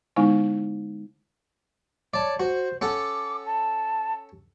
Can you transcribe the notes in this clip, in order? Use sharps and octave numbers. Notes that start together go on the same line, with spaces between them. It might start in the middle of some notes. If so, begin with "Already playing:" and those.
D3 G#3 B3 D#4 E4 G#5
C#5 D5 A5
F#4 C5
C#4 A4 F#5 D6
A5